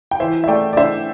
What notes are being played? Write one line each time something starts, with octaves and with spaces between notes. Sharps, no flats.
G5
E3 C5 E5
E5
A3 D5 G5
D5
D4 C5 E5